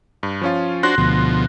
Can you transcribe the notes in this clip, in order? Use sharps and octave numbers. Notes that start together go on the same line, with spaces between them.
G2
F3 C#4 F4
D4 F#4 C5 C6 F#6 A#6
D2 B2 F3